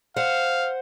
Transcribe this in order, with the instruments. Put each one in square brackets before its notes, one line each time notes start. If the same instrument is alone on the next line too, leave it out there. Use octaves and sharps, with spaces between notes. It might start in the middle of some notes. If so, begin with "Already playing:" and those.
[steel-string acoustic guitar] C5 F#5 [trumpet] F5